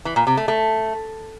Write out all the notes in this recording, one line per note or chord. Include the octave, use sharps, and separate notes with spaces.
E3
A#2
C3
A3
A3